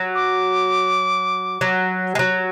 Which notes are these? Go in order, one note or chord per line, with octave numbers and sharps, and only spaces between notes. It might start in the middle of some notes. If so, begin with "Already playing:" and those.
Already playing: F#3
D6
F#3
G#3
F#3